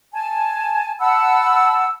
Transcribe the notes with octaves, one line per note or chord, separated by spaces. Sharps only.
G#5 A5
F#5 A5 B5 E6